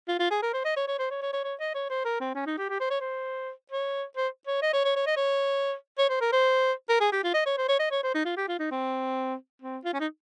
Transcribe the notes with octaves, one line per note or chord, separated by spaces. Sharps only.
F4
F4
G#4
A#4
C5
D#5
C#5
C#5
C5
C#5
C#5
C#5
C#5
D#5
C#5
C5
A#4
C4
C#4
D#4
G4
G4
C5
C#5
C5
C#5
C5
C#5
D#5
C#5
C#5
C#5
D#5
C#5
C#5
C5
A#4
C5
A#4
G#4
G4
F4
D#5
C#5
C5
C#5
D#5
C#5
C5
D#4
F4
G4
F4
D#4
C4
C4
F4
C#4
D#4